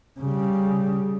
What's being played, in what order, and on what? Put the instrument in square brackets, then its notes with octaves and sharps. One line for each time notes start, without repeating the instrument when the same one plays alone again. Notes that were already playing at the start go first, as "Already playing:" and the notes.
[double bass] C#3 G3